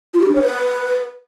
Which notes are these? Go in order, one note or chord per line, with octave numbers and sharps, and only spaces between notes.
F4
G4
D4
C#5
B4